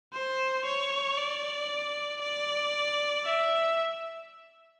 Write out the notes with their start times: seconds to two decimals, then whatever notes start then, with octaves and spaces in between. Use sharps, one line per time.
0.14 C5
0.65 C#5
1.18 D5
2.21 D5
3.25 E5